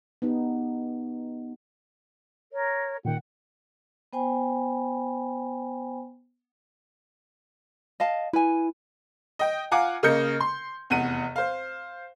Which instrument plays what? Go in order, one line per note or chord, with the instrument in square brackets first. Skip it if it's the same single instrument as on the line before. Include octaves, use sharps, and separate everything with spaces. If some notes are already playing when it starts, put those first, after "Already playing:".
[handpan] B3 D#4 G4
[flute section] A#4 C#5
[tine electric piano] A#2 D#3 [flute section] F#5 G5
[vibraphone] B3 C5 G5 G#5 B5
[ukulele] D#5 F5 A5
[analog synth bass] E4 [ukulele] B4 G#5
[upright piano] D#5 G5
F4 F5 F#5 G#5 A#5 D6
C#3 A#3 A#4 D#5 G6 C#7
C6
F1 E2 F#5 D#7
C5 F5